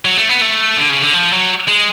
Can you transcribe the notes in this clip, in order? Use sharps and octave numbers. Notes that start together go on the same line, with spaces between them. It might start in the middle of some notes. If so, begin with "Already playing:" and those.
F#3
A3
B3
A3
D3
C#3
D3
F3
F#3
G#3